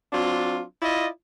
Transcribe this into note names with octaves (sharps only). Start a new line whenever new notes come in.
F#3 C4 D4 F4
E4 F4 D5 D#5